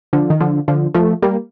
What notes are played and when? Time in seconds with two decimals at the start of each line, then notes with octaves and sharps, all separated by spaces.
0.13 D3 F3
0.30 D#3
0.40 D3 F3
0.68 D3 F3
0.94 F3 A3
1.22 G3 A#3